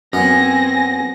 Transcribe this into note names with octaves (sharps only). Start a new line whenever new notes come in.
F#2 F#3 B3 C4 G#5 A#6